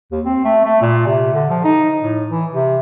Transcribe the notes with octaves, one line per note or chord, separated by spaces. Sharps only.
D#2
C4
A3
A3
A#2
C3
D3
F3
D#4
A2
E3
C3